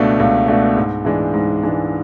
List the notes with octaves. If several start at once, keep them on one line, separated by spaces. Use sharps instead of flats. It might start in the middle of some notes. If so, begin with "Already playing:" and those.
Already playing: C#2 B2 A3 D4
C#2
B2 A3 D4
G#2
E3 G#3 D4
G#2
E3 G#3 D4